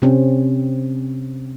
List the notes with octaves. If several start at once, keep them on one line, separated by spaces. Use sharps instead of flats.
C3 C4 C#4